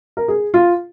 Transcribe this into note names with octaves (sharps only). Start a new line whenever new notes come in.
A#4
G#4
F4